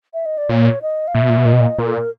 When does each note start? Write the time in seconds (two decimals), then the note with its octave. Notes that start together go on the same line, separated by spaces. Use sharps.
0.14 E5
0.26 D#5
0.38 D5
0.49 A#2 C#5
0.82 D#5
1.08 F5
1.15 A#2 E5
1.22 B2
1.29 A#2
1.37 B2
1.45 A#2 D#5
1.53 B2
1.61 A#2
1.78 A#2 A#4
1.87 A4
1.94 A#4